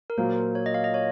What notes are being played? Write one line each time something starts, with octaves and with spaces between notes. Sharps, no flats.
A#4
A#2 F#3 A#3 F4 C5
C#5
D#5
F5
D#5
C#5